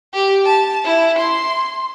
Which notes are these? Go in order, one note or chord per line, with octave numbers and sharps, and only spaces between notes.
G4
A5
E4
C6